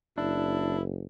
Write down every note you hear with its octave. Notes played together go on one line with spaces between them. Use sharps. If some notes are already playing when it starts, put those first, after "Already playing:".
F#1 D4 E4